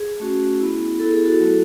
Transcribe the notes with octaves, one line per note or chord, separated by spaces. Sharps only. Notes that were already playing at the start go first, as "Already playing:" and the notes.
Already playing: G#4
A3 C#4 F#4
B3 E4
B3 E4 A4
G#4
F#4 A4
F#3 A3 E4